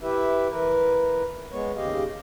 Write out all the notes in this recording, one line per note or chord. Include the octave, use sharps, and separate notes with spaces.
E4 G4 B4 E5
E3 A#4 B4
G#3 B3 C#5
D#2 C#3 G4 D#5 F5